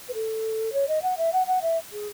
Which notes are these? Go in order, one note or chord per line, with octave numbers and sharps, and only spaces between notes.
B4
A4
C#5
D#5
F#5
E5
F#5
F#5
E5
G#4